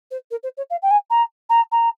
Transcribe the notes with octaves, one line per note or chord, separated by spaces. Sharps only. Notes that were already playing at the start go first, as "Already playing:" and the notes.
C5
A#4
C5
C#5
F5
G5
G#5
A#5
A#5
A#5